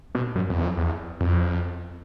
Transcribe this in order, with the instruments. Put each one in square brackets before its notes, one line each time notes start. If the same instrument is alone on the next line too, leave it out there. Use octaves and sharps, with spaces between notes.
[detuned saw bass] B2
F#2
F2
E2
F2
E2
F2